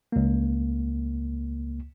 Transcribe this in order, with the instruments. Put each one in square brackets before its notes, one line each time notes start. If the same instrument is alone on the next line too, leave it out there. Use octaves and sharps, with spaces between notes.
[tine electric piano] C#2 A#3